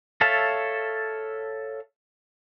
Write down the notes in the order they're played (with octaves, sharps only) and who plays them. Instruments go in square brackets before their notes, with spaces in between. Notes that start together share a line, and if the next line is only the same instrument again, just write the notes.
[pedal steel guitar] A4 C#5 E5 F5 A5